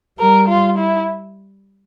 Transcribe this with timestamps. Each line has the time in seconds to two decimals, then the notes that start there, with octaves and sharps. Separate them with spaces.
0.19 G3 A#4
0.49 F4
0.78 E4